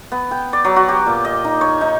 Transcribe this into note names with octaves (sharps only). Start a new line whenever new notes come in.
B3
G5
D5
F#3
F#4
G4
A#2
D#5
D#4
C#5
D#4